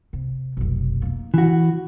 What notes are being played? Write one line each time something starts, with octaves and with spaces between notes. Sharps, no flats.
C3
F1 B1
A#3 D#4
E3 F#4